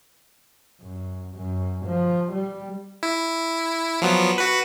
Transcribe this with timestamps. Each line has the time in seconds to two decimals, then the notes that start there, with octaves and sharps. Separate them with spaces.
0.81 F#2
1.36 F#2
1.86 F3
2.32 G3
3.03 E4
4.02 F3 F#3 B3
4.38 F#4 B4